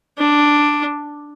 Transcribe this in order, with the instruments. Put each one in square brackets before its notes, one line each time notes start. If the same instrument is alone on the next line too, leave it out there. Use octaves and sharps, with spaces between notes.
[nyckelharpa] D4